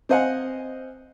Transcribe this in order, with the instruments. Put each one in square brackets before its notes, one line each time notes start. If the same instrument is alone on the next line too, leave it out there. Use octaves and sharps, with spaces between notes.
[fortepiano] C4 C5 D#5 F5 F#5 G#5